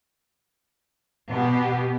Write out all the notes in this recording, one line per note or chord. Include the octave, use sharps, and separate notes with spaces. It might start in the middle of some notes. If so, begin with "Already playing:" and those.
B2 B3 G4